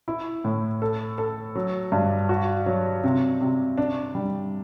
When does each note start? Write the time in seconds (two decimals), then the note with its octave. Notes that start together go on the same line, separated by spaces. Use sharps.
0.08 E4
0.44 A2
0.82 A4
1.18 A4
1.55 F#3
1.92 G2
2.29 F#4
2.66 F#3
3.04 C3
3.41 C3
3.78 D4
4.15 G3